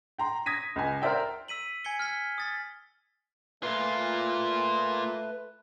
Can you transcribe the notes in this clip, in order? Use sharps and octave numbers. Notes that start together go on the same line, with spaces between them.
G5 A#5 C6
D#6 G#6 A#6 B6 D#7
C#2 G#5
A#4 C5 D5 E5 G5
E6 B6 D#7 F#7
G#5 G#6 B6 C#7 G7
F6 G#6 B6
D#6 A6 B6
A#2 A3 F4 B4